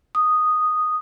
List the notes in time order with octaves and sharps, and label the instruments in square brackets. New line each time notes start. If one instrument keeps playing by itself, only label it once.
[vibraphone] D#6